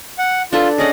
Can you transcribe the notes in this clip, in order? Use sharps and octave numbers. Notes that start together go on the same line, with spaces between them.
F#5
D4 F4 A4 B4
C#4 G#4 D5 D#5 F#5